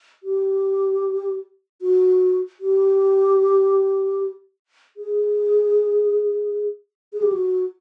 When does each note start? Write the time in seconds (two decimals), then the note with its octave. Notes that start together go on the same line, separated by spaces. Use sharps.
0.23 G4
1.82 F#4
2.60 G4
4.97 G#4
7.13 G#4
7.22 G4
7.33 F#4